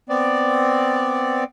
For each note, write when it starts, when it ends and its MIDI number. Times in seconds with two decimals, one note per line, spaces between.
0.09 1.44 59
0.09 1.44 60
0.09 1.44 74